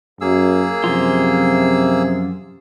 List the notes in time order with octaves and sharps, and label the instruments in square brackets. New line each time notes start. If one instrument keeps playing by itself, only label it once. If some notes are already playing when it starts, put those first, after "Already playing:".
[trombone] F#2 [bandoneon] A#3 G#4 E6
[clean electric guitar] F#2 F3 F4 [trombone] C3